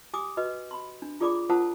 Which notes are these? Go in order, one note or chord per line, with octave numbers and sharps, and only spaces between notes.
G4 G#5 D6 D#6
F#4 B4 D#5
B5 C6
D4
F4 G#4 A4 D5 B5 D6
F4 A#4 C5 F#5 A5 D#6